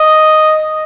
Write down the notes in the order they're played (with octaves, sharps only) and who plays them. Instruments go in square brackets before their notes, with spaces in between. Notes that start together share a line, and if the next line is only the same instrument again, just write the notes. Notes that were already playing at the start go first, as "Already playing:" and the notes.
Already playing: [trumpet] D#5